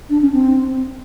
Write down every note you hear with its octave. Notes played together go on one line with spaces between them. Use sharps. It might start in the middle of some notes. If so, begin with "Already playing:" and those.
D4
C#4
C4